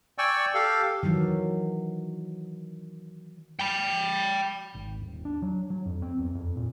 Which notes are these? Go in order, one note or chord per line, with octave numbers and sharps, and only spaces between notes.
D5 G5 G#5 C#6 E6
G4 A4 F5
D#3 E3 F#3
G5 B5
G#1
D#1
D4
F#3
F#3
F2
C4
E2
F2
A#2